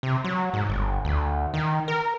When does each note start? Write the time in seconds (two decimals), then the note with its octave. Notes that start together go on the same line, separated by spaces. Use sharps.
0.03 C3
0.24 F#3
0.54 G#2
0.69 G1
1.05 D2
1.54 D#3
1.88 A#4